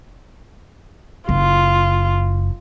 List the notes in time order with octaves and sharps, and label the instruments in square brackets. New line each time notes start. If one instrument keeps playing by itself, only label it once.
[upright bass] F#1 [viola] F4